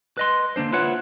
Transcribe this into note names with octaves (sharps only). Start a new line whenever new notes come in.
B4 D#5 C6
D3 A#3 D4 C5
E4 F4 B4 C#5 F#5